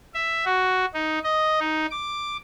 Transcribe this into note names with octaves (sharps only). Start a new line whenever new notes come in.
E5
F#4
D#4
D#5
D#4
D6